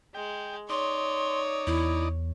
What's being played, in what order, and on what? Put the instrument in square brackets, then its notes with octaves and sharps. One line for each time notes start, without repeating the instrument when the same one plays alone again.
[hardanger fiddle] G#3 [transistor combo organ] G5
[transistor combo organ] D#4 D5 [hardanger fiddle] C#5 [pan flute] C6
[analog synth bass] E2 [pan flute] E4